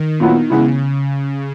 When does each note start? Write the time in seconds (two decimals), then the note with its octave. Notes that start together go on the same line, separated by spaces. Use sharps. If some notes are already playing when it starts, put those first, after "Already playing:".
Already playing: D#3
0.20 A#2 F#3 B3 E4
0.50 C#3 E3 G#3 B3 E4